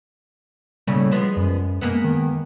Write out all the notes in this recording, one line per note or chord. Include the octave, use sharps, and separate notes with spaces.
D#2 A2 C#3 G3
F3 G#3 B3
F#2
G#3 A#3 B3
D#3